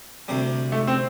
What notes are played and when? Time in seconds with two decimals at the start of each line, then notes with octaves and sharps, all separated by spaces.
0.28 D2 C3 G3
0.72 A3
0.87 C4